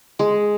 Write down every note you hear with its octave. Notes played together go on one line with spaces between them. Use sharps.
G#3